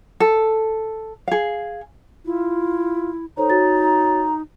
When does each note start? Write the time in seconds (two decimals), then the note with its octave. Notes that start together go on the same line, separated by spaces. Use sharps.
0.20 A4
1.28 G#4 F5
2.25 E4 F4
3.37 D#4 A4 C5 C#5 A#5
3.50 F#4 C#5 A6